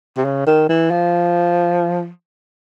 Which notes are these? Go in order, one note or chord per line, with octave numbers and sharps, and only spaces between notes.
C3
C#3
D#3
E3
F3